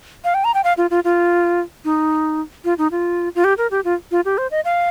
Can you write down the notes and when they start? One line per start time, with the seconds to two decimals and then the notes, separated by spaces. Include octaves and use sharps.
0.24 F5
0.34 G5
0.44 A#5
0.54 G5
0.64 F5
0.77 F4
0.91 F4
1.05 F4
1.85 D#4
2.65 F4
2.78 D#4
2.91 F4
3.35 F4
3.44 G4
3.58 A#4
3.71 G4
3.84 F4
4.11 F4
4.25 G4
4.38 C5
4.51 D#5
4.65 F5